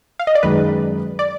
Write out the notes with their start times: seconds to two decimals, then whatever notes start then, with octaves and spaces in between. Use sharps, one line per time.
0.19 F5
0.27 D#5
0.35 D5
0.43 F#2 D#3 G#3 B4
1.19 D5